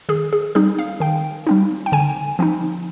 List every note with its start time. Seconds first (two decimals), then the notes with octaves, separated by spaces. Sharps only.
0.09 D#3 G#4
0.33 G#4
0.55 G3 C4 D#4 G#4
0.78 F5
1.00 D#3 G5
1.47 G3 C4 D#4
1.86 G5
1.92 D3 G#5
2.39 F3 C4 D#4